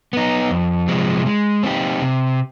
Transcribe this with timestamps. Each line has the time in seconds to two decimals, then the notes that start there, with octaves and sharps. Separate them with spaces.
0.13 B3 D#4
0.51 F2
0.88 C3 F3 G#3
1.26 G#3
1.63 C4 D#4 G4
2.01 C3